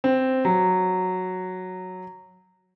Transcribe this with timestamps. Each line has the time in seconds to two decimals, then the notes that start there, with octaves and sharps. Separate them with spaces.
0.04 C4
0.45 F#3